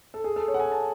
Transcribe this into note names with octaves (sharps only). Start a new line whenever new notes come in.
A4
G#4
A4
C#5
F#5
G#5
A5